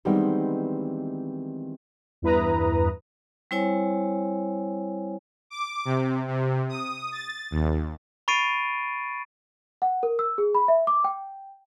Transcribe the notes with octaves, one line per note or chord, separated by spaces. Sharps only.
D#3 E3 G3 G#3 B3 C4
E2 G2 E4 B4 A#5 D#6
G3 C4 E4 C5 C#5 G#5
D6
C3
C3
D#6
A6
D#2
B5 C#6 A6 C7 D7 D#7
F#5
A#4
E6
G#4
B5
E5
D6
G5